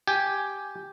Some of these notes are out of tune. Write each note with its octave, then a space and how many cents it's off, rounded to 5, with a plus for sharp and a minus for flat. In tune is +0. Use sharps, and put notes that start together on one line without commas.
G4 +0 G#5 +5